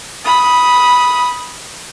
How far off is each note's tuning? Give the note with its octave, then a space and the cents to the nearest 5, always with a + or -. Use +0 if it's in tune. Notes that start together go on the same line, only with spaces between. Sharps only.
B5 -10 D#6 +10